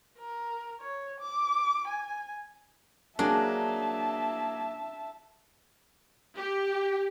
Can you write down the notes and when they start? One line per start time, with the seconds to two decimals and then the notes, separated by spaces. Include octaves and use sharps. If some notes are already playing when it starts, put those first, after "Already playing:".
0.18 A#4
0.81 C#5
1.21 D6
1.88 G#5
3.19 F#3 A#3 D4 G#4 E5 A5
6.37 G4